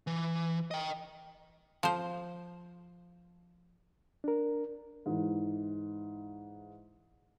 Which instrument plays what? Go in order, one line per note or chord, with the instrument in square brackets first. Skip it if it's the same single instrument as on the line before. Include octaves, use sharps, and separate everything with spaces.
[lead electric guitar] E3
D#5 G5
[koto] F3 C5
[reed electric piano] D4 A#4
[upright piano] G#2 E3